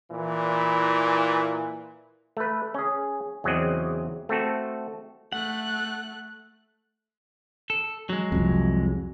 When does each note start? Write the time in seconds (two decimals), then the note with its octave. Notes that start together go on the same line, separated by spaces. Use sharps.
0.11 A#2 E3
2.37 A3 B4
2.74 C#4 G#4
3.44 E2 C#3 F#3 C4 D5 D#5
4.29 A3 C4 F#4 A4
5.32 A3 F#5 F#6
7.70 A4
8.09 F#3 G#3
8.32 C2 F2